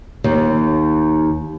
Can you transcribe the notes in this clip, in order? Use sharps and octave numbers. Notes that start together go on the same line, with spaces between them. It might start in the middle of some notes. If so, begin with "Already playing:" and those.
D#2